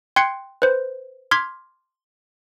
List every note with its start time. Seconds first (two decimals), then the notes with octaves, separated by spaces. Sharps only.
0.16 G5 C6 F#6 G#6 C7 C#7
0.62 B4 C5
1.31 C6 D6 F6 G#6 B6